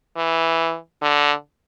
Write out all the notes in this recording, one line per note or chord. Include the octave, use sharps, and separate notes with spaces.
E3
D3